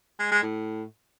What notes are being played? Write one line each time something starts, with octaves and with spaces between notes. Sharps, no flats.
G#3
G#3
A2